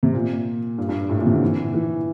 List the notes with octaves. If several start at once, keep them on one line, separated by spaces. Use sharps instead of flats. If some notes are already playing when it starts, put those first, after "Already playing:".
C3
A#2
G2
G2
A2
A#2
C3
D3
E3
E3